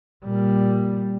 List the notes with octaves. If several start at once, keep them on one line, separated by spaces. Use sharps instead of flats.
A#2 G3